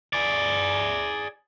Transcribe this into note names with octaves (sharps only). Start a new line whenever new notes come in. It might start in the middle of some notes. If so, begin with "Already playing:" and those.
G#4 D5